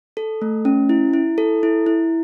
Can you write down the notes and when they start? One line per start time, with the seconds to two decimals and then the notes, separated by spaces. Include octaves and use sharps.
0.17 A4
0.42 A3
0.65 C#4
0.89 E4
1.13 E4
1.38 A4
1.63 E4
1.86 E4